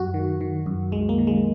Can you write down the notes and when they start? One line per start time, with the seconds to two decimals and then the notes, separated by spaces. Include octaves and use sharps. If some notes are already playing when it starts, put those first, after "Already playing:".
Already playing: F#2 F#4
0.14 D#3
0.41 D#3
0.66 F#2
0.92 C2 G#3
1.09 A#3
1.18 D#3
1.27 G#3